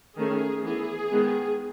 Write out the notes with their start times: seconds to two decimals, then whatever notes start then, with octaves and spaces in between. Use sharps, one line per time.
0.17 D#3 A3 C#4 G#4
0.63 E3 B3 G#4
1.10 D#3 G#3 B3